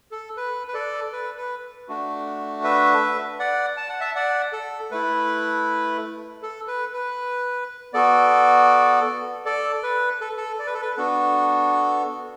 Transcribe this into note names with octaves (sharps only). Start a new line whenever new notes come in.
A4
B4
B4
A4 D5
B4
B4
A3 D4 F#4
B4 E5
D5 F#5
A5
F#5
E5 A5
D5 F#5
A4
A3 E4 B4
A4
B4
B4
B3 F#4 A4 D5
A4 D5
B4
A4
A4
D5
B4
A4
B4
B3 D4 F#4 A4